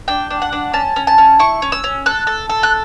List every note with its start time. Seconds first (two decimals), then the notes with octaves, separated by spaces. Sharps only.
0.08 D4 G5
0.30 D4
0.42 F#5
0.53 D4
0.73 C#4 A5
0.96 C#4
1.07 A5
1.18 C#4
1.39 E4 C#6
1.62 C#4
1.72 E6
1.84 C#4
2.06 A4 F#6
2.27 A4
2.49 A4
2.63 F#6